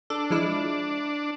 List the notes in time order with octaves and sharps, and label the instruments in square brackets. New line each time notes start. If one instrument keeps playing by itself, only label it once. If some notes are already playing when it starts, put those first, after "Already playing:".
[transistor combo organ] D4 [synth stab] A4
[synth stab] F3 G#3 E4